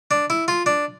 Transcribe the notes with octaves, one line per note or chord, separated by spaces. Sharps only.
D4
E4
F4
D4